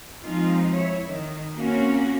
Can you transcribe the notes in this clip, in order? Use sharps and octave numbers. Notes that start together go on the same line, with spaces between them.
F3 G#3 C4 D#4 F4
E4 C#5
D#3
A#3 C4 C#4 F#4